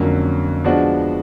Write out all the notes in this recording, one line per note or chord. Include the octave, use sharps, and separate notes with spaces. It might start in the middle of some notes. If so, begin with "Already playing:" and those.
Already playing: F2 D3 F#3 A#3 C#4
F3 G#3 B3 D4 F#4